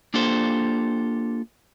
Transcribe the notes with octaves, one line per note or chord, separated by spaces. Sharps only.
A#3 D4 F4 G4 A4 C5